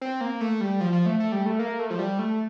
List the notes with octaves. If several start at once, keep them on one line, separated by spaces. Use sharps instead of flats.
C4
A#3
A3
G3
F3
F3
A3
A3
G3
A3
A#3
A3
F3
G3
A3